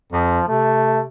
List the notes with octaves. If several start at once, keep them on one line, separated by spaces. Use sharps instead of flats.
F2 F3
C3 A3